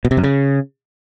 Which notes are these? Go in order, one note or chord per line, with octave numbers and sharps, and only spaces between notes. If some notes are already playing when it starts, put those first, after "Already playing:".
B2
C3
F#2
C#3